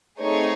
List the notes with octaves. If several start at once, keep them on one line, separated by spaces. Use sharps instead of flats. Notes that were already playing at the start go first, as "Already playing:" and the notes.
A3 C4 D#4 G#4 C#5